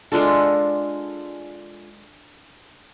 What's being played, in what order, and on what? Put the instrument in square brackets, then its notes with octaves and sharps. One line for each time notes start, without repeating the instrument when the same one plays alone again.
[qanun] G#3 D4 F4 A4